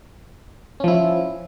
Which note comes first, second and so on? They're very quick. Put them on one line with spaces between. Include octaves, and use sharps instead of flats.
C#4 F3 E4